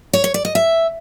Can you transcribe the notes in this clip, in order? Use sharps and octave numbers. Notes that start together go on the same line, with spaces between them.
C#5
C#5
D5
D#5
E5